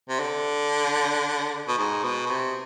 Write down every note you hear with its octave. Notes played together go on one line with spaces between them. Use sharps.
C3
D3
B2
G#2
B2
B2
C3